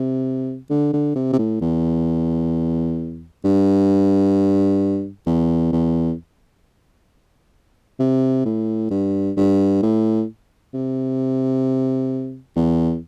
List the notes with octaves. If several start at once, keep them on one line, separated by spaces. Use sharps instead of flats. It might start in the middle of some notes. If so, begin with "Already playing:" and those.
Already playing: C3
D3
D3
C3
C3
A2
E2
G2
E2
E2
C3
A2
G2
G2
A2
C3
E2